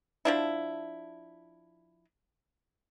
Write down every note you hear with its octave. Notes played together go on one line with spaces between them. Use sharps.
F3 D4 E4